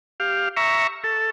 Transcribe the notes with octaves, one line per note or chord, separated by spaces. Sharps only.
G4 F5
E5 A#5 C#6
A4